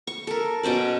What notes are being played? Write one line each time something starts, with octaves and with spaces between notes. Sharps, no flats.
C#6
A4 A#4
B2 C#4 C5 D5